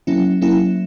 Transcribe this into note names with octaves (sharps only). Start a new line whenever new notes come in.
F#3 A#3 C#4 E4
F#3 A#3 C#4 E4